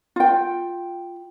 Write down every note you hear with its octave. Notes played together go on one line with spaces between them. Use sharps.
F4 G5